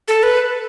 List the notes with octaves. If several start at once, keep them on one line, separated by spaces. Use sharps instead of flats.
A4
B4